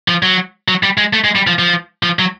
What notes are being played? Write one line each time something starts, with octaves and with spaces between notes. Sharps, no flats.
F3
F#3
F#3
G3
G#3
A3
G#3
G3
F3
F3
F3
F#3